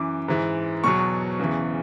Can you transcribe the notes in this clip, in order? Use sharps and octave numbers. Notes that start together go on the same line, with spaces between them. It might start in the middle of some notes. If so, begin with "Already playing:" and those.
Already playing: F#2 E3 D6
G#2 E3
E2 B2 F#3 C#6
E2 C#3 E3